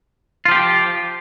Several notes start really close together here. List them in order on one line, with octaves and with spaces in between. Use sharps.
F4 F3 G4